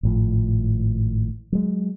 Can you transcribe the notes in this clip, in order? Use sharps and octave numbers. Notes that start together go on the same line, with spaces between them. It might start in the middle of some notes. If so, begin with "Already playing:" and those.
G#1 A2 F3
F#3 G#3